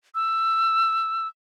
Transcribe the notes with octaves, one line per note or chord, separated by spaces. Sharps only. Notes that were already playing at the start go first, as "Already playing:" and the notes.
E6